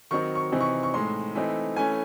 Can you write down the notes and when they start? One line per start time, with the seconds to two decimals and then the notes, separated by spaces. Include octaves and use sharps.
0.11 D#3 F#3 C4 D#4 C#6
0.35 C#6
0.52 C3 E3 C4 D#4
0.61 C#6
0.83 C#6
0.94 A2 G#3 D#4 C6
1.35 E3 A3 C4 D#4
1.76 E3 A3 C#4 G#5